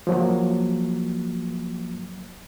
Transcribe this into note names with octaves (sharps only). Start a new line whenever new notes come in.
F3 F#3 A#3